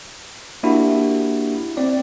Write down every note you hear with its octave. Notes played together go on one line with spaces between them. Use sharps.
A#3 D4 E4 F#4 G4
C4 D5